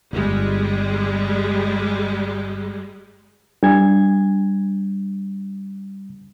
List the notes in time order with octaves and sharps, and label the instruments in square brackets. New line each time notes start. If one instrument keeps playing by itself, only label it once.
[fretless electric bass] D1 G1 [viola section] G3 G#3
[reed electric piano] G3 G#6 [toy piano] D4